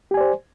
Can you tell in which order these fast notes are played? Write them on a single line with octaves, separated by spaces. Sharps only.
G4 G#5 D5 C5